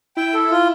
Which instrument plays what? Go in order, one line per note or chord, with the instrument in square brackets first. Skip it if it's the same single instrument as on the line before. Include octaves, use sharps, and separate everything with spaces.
[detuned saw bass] E4 [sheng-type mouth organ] G5
[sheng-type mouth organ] A4
F4